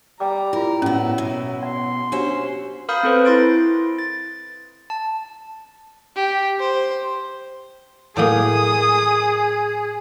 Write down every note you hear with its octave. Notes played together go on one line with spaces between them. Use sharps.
G3 G5 A#5 D6
E4 F4 A#4
A2 F#3 B3 C#4 E4
B2
F#5 C6
C#4 D4 F#4 G4 C5 E5
A#4 F5 B5 D#6 F6 G6
C4 A4 B4 C5
E4 C6 A6 D7
A6
A5
G4
C5
A2 F#3 A#3 G#4 D#6